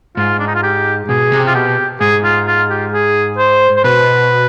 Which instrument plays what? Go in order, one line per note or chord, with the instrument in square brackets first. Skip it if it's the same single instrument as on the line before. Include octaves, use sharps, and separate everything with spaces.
[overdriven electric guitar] G#2 [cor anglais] F4
[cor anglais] D4
D#4
F4
G4
[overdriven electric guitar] B2 [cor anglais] G#4
[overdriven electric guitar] C3
[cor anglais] F4
[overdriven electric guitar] B2 [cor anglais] G4
[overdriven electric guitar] G#2 [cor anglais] G#4
[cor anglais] F4
F4
G4
G#4
C5
C5
[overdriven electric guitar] B2 [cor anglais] B4